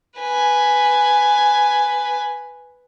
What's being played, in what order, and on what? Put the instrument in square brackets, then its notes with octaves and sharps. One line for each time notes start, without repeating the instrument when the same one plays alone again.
[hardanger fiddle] B4 G#5